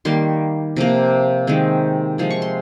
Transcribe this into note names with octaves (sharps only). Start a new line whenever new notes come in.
D#3 G3 A#3 C6
C3 F3 A#3
D#3 G#3 C4
C3 F3 G#3
C#6
C6